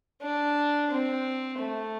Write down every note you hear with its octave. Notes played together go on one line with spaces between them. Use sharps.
D4
C4
A3